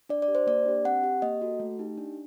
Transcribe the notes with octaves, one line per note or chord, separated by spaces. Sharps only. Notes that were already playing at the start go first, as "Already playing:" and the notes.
D4 D5
D5
G4
C5
A#3 D5
D4 G4
C4 F#5
G4
A#3 D#5
F#4 A4
A3
D#4 G4
D4